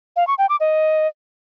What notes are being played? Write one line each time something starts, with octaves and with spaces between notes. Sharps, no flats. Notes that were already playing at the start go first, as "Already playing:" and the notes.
F5
C#6
G5
D6
D#5